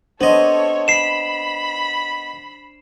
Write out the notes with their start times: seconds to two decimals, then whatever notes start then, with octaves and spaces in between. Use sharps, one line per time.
0.21 B3 D4 A4 C5 C#5 D#5
0.88 B5 C7 E7